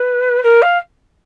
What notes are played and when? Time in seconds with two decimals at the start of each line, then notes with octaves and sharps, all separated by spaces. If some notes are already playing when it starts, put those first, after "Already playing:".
Already playing: B4
0.43 A#4
0.62 F5